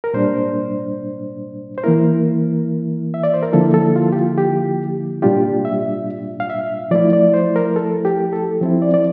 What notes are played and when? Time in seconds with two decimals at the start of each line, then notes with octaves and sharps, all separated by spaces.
0.04 A#4
0.14 A#2 G3 D4 C5
1.78 C5
1.84 E3 A#3 E4 A#4
3.14 E5
3.23 D5
3.34 C5
3.43 A#4
3.53 D3 F3 A#3 E4 A4
3.74 A4
3.96 F4
4.12 G4
4.16 F4
4.38 G4
5.22 A#2 G3 D4 F4 G4
5.65 E5
6.40 F5
6.50 E5
6.91 F3 A3 E4 D5
7.13 D5
7.34 C5
7.56 A#4
7.76 A4
8.05 G4
8.33 A4
8.61 F3 C4 E4
8.82 D5
8.94 D5